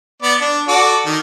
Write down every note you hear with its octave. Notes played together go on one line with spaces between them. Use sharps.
B3 D5
D4
F#4 A4 D5
D#3